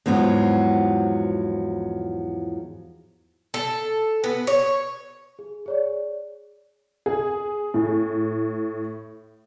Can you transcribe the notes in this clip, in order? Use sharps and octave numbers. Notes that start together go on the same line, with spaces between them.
E2 G#2 F3 F#3
A4
B3
C#5
G#4
G#4 C#5 D5
G#4
A2